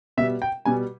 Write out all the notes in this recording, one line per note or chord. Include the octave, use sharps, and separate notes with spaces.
B2 G3 E5
G5
B2 G3 G#5